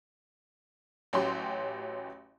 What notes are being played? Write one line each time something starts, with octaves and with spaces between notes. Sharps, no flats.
A1 F#3 C#4 G4 C6